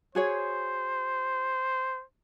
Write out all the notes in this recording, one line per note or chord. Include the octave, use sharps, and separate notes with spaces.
F#4 G#4 C5 C#5